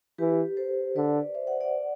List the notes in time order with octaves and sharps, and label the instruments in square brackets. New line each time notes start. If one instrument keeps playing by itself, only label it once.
[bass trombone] E3 [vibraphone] G4 B4
[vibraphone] A4 C5
[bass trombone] D3 [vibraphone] B4 D5
[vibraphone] C5 E5
D5 F#5
D5 F#5